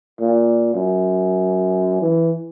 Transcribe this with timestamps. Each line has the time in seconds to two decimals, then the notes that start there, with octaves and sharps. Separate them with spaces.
0.20 A#2
0.75 F#2
2.02 E3